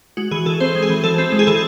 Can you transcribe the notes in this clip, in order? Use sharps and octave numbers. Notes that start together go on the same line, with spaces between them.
G#3 F#4
E3 G#4
E3 A4
C4 C5
G#3
G#4
E3
E3 A4
C4
G#3
G#4
E3 A4